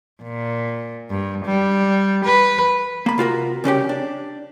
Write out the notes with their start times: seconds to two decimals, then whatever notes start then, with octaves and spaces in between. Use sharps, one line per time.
0.23 A#2
1.10 G2
1.46 G3
2.25 B4
3.06 A#3 B5
3.18 C3 F4 F#4 A#4
3.64 C2 C#3 C#4 G4
3.89 D4